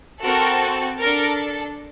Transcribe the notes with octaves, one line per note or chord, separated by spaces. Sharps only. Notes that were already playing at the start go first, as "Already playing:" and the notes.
C4 F#4 A4 A#4
D4 A4 A#4